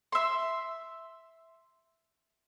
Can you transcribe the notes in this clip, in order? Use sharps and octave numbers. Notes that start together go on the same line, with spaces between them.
E5 C6